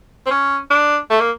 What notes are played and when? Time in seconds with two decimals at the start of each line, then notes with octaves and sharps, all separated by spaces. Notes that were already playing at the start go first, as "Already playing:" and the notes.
0.26 C4
0.31 C#4
0.71 D4
1.10 A3
1.20 A#3